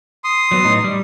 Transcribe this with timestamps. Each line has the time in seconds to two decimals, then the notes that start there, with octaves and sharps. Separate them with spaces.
0.24 C6 D#6
0.52 F#3 B3
0.64 A2 D#4
0.84 G3